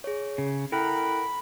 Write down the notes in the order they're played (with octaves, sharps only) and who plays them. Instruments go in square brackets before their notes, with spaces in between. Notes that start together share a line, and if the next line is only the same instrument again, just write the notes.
[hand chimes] G#4 C#5
[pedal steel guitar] C#3
[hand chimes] E4 A4 G5 [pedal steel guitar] A#4 F#5 [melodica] B5